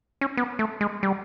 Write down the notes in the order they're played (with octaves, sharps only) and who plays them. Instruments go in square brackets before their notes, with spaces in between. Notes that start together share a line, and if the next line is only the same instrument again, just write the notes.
[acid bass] C#4
B3
A3
G#3
G3